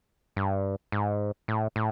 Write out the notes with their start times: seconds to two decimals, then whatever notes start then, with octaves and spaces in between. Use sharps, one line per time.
0.36 G2
0.92 G#2
1.48 A2
1.76 A2